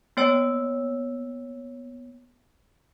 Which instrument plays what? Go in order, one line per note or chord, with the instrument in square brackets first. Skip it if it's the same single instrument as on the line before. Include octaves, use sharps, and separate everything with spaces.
[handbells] A#3 B3 C#5 G5 E6